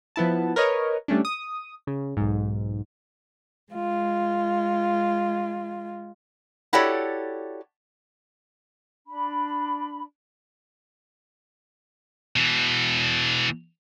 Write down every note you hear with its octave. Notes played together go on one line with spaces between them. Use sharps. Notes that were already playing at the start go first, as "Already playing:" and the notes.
F3 B3 E4 A5
A#4 B4 C#5 D#5
G3 A3 C#4 D4
D#6
C#3
B1 G#2
G#3 F4
E4 F#4 G4 A4 C#5 D5
D4 B5
B2 E3